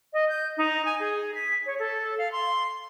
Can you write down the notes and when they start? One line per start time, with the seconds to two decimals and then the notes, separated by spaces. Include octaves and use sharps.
0.13 D#5
0.29 G6
0.57 D#4
0.85 G#5
1.00 G#4
1.35 B6
1.66 C#5
1.79 A4
2.18 F5
2.32 C6